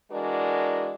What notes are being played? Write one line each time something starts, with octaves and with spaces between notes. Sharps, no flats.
E3 G#3 D4 F#4 A#4 D5